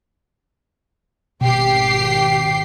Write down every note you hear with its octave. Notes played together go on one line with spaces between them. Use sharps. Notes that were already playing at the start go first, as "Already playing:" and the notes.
G#1 B2 G4 C7